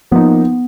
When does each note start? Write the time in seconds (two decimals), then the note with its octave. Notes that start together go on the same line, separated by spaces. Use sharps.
0.11 F3 A#3 B3 D#4